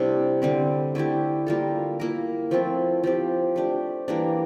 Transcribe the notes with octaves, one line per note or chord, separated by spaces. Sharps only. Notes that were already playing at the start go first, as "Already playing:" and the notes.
Already playing: C3 G3 A3 D4 E4
D3 G3 C4
D3 A3 E4 G4
G3 A#3 F4 A4
A#3 E4 A#4
F3 A3 C4 E4
F3 C4 G4
A3 D4 G4
E3 G3 A#3 D4